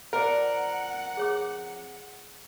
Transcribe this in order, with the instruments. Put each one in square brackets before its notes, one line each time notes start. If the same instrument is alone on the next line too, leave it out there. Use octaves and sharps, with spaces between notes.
[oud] F2 C5 D5 [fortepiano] A#4 [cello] F#5
[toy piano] G#4 C#5 D6